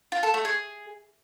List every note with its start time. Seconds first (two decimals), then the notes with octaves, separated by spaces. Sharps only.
0.12 F4
0.23 A4
0.34 A3
0.45 G#4